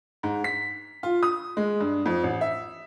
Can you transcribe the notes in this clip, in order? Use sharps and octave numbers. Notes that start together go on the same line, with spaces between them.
G#2
B6
F4
D#6
G#3
G2
F2
A1
E5